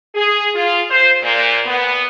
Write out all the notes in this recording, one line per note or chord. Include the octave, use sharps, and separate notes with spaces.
G#4
F4
C5
A#2
B3